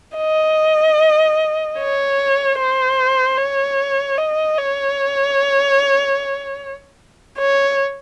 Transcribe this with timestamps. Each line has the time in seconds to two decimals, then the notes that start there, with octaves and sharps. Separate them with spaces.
0.17 D#5
1.78 C#5
2.58 C5
3.38 C#5
4.18 D#5
4.58 C#5
7.39 C#5